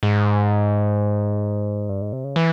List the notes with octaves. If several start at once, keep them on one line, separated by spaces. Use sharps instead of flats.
G#2
G2
G#2
C3
C#3
E3